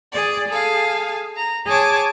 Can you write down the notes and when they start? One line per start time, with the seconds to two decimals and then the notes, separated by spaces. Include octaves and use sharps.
0.12 G#4 D5
0.48 G#4 A4 F5
1.37 A#5
1.66 G#4 C#5 A5 D6